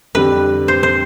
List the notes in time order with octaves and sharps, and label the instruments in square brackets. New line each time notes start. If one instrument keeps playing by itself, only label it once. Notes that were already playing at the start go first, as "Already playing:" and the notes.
[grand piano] F2 D3 G3 D4 G4 [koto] B4
[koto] C5
C5